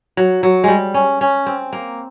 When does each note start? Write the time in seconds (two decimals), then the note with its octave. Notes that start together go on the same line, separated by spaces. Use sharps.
0.17 F#3
0.43 F#3
0.64 G3 G#3
0.94 C#4
1.21 C#4
1.46 C4
1.73 A#3